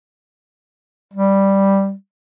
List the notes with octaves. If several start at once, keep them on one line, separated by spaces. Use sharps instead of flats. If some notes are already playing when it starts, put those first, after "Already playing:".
G3